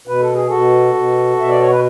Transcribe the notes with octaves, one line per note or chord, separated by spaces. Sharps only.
B2 B4
A4
G#4
B2 F#4 A4
B2
B2 E5
D5
C#5
B4